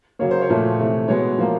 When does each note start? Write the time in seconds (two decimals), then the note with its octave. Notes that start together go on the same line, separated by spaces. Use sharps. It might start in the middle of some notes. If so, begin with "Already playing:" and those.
0.19 C#3 F#3 A#3 C#5
0.31 C5
0.41 C#5
0.49 A#2 F3 A3
0.79 C3 E3 A3
1.08 B2 G#3 B3 C#5
1.38 A2 F3 A#3